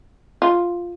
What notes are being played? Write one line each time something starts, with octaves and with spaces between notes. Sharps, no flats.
F4